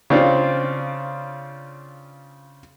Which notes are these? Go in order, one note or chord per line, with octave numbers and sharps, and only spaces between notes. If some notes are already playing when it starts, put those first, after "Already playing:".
C#3 C4 D4 F4